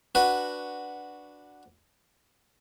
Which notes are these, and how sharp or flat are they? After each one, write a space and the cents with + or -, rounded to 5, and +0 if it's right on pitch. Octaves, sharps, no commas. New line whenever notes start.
D4 +0 F#4 +0 B4 +0